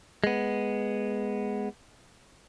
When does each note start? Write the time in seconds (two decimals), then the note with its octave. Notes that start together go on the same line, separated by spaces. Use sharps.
0.24 G#3 B3